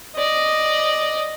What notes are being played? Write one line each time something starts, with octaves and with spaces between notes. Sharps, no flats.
D5 D#5